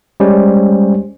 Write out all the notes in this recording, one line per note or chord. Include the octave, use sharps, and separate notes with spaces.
G3 G#3 C#4 G4 C5